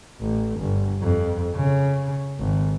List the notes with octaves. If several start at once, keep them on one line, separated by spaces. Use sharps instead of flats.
A1
G1
F2
C#3
G#1